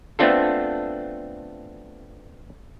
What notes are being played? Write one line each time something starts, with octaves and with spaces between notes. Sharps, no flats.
A3 B3 C4 D4 F4 A4